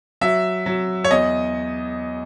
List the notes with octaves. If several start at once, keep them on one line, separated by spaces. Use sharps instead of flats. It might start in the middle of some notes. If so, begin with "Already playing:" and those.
F#3 E5
F#3
C#5
E2 D#5